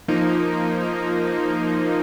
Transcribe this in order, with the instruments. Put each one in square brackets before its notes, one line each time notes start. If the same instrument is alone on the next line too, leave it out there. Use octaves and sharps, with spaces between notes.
[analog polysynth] F3 A#3 D#4